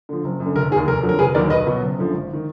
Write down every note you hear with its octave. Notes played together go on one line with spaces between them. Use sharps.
D3 F3
F#1
F#2
D3
F1 A#4
D#3 G#4
D#2
F1 A#4
F2 D3 F#3
A#4
F1 G#4 B4
D#2 D#3 F#3 A#4 D5
B1 B4 D#5
B2 F#3
F#1
F#2 D3 F3
G#1
D#3